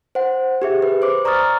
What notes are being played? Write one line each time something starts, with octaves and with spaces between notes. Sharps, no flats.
C5 F#5
G4 G#4 E5
B4
C5 D6
D5 A#5 C#6 D#6 F6 A6